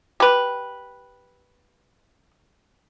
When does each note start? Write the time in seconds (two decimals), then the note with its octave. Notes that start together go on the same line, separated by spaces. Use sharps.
0.20 G4 B4